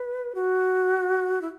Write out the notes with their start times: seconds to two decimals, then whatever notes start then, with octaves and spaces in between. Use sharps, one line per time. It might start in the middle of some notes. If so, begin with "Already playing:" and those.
Already playing: B4
0.35 F#4
1.42 E4